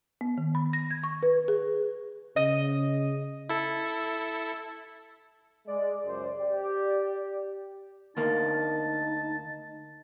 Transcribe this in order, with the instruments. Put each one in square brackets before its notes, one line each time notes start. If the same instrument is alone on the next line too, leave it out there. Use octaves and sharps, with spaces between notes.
[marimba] B3
D#3
B5
A#6
G#6
C#6
B4
G#4
[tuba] C#3 [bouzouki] D#5
[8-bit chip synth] E4 A4
[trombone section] G#3 [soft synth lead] D5
[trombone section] C#2 F#2 C5
G4
[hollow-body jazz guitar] D2 A#3 [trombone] D#4 [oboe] A5